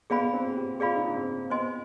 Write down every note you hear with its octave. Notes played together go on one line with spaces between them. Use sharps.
B3 G#4 D5 F5 G#5 B5
C4
G4
F4 G#4 D5 F5 G#5 B5
D#4
D4
C4
B3 C5 D#5 G#5 C6